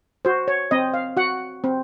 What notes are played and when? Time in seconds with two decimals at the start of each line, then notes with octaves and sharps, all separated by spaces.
0.25 F#4 C5
0.48 C#5
0.71 C4 D#5
0.94 F5
1.17 F#4 F#5
1.64 C4